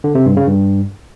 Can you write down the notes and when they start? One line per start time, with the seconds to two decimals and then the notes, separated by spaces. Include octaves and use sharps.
0.04 D3
0.15 C3
0.26 G2
0.37 C#3
0.48 G2